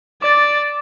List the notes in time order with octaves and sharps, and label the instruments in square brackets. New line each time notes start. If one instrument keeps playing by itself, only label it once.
[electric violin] D5 [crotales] D6 A6